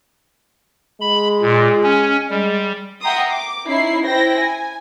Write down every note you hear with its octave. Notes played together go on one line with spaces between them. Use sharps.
G#3 B5
A#2
C#4
G3 G#3
E5 F#5 G5 A#5 C6 D#6
D6
C#4 D#4 E4 C7
E4 C5 G5 A#6
G#5